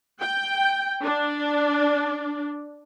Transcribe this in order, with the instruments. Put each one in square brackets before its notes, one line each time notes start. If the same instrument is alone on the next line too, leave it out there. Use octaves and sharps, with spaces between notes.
[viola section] G5
D4